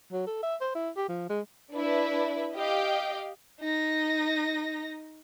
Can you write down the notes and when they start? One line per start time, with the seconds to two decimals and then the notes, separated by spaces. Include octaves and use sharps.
0.12 F#3
0.27 A4
0.43 E5
0.61 C5
0.75 E4
0.97 G4
1.09 F3
1.30 G#3
1.73 D4 E4 B4 E5
2.54 G4 D#5 F5 G5
3.61 D#4 A#6